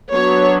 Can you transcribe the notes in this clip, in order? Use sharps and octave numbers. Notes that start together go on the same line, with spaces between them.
F#3 B3 D4 C#5